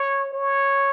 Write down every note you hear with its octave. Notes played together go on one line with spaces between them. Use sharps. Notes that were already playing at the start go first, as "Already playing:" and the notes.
Already playing: C#5
C#5